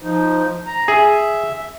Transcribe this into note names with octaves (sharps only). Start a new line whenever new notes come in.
F3 D#4
A#5
G#4 E5